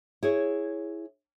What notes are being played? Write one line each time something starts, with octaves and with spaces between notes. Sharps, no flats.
E4 G#4 C#5